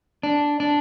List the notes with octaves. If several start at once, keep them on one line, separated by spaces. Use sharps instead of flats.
D4
D4